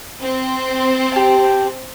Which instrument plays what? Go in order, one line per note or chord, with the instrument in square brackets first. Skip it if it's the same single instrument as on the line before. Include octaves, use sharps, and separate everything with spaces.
[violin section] C4
[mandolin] G4 A5